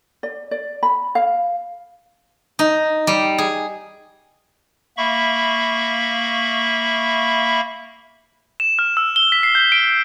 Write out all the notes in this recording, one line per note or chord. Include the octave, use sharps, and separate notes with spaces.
D5
D5
B5
F5
D#4
G3
G#4
A#3 E5 B5 C#6
E7
F6
E6
G7
B6
C7
G6
D7